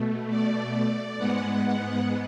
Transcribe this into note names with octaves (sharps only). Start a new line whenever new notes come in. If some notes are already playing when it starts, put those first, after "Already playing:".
Already playing: B2 A3
D5
G#2 G#3 B3 F#5